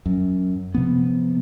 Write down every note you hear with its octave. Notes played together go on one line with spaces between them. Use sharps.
F#2
C3 F3 B3